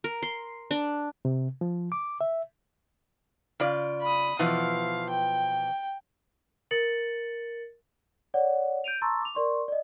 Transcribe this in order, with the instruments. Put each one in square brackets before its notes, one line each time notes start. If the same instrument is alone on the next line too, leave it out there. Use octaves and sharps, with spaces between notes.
[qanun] A#4
C6
D4
[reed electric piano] C3
F3
D6
E5
[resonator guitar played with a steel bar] C#3 F4 D5
[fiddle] B5 D#6
[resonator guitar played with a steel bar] B2 E3 F3 [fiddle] F5
[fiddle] G5
[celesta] A#4 A6 C#7 F#7
C#5 D5 F#5
G6 D7 D#7 F7
A5 A#5 C6 C#6 E6 A6
D6 F7
A#4 D5 C6 C#6
D5 D#5